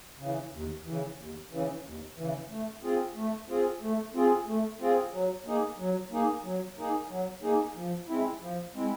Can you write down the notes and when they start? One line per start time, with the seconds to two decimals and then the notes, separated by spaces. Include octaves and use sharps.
0.19 C#3 E3
0.53 D#2
0.85 C#3 E3
1.18 D#2
1.52 C#3 E3
1.84 D#2
2.17 C#3 E3
2.50 A3
2.83 C4 F4 G#4
3.15 A3
3.48 C4 F4 G#4
3.81 A3
4.14 C4 F4 G#4
4.47 A3
4.80 C4 F4 G#4
5.13 F#3
5.46 A#3 D#4 G#4
5.78 F#3
6.11 A#3 D#4 G#4
6.44 F#3
6.77 A#3 D#4 G#4
7.09 F#3
7.42 A#3 D#4 G#4
7.76 F3
8.08 G#3 C4 E4
8.41 F3
8.74 G#3 C4 E4